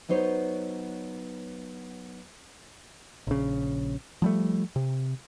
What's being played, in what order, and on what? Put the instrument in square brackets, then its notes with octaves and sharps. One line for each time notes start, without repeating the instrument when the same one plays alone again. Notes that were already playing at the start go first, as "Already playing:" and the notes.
[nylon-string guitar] F#3 B3 D#4 C5 C#5
[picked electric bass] A#1 C#3
F3 G3 A3
C3